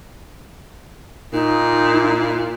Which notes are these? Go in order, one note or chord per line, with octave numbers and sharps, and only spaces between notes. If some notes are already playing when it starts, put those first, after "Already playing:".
A#2 D#4